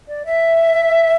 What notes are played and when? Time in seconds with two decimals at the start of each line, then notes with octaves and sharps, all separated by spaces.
0.09 D5
0.25 E5